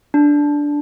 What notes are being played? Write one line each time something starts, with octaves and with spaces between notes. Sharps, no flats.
D4